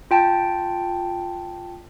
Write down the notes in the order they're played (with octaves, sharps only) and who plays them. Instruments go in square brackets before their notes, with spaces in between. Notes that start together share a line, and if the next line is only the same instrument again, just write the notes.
[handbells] F4 G5 A5